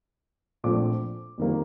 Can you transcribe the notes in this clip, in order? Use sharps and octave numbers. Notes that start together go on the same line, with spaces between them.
A#1 A#2 F3 A3 C4 D6
F2 D#3 G3 A#3